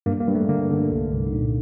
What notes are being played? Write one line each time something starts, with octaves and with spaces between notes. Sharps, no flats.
G2 A#3
A#3
G2
A3
D3 A#3
D3
C2
C2
D#4
A#2 D4